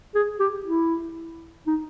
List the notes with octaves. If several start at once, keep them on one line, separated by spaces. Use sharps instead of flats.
G#4
G4
E4
D#4